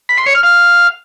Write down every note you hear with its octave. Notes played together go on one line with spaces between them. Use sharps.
B5
C6
C#5
F6
F5